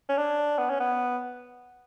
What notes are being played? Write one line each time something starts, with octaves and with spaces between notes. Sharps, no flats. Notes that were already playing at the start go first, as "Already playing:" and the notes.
C#4
D4
B3
C#4
B3